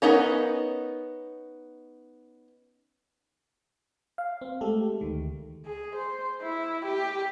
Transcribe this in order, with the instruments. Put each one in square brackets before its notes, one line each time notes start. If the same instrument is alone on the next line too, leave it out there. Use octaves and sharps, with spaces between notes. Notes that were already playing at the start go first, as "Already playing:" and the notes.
[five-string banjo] B3 C#4 D#4 A#4
[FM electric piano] F5
C4
G#3 A3 G4 A4
D2 D#3
[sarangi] G#4
C5
E4
G4